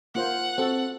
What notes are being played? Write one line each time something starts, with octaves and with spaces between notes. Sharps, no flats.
A#3 F4 C5 F#5
C4 F#4 A4